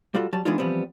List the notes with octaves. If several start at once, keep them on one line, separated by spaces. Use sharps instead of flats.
G3 F4 F#4 A4
F#3 G3 A5
E3 G#3 B3 D4 D#4 F4
E3 F3 G3 B3 C4